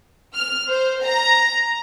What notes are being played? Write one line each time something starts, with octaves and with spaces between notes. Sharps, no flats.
F6
C5
A#5